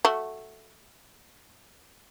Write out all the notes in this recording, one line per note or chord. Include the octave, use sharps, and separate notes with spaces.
A3 F#4